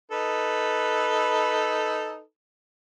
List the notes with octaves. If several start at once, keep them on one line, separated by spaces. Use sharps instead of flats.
D#4 A4 B4